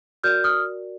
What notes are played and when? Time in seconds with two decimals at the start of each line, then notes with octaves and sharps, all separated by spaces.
0.24 F#4 A#4 D5 F6 G6
0.44 D#6 F6